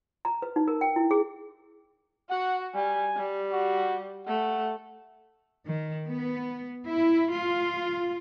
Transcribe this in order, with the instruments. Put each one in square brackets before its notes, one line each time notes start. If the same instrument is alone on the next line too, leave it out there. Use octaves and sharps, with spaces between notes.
[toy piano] A#5
B4
D#4
A#4
G5
E4
G#4
[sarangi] F#4 [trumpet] F#5
[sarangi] G3 [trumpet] G#5
[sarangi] G3
[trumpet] F#4
[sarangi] A3 [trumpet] F#5
[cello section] D#3
B3
E4
F4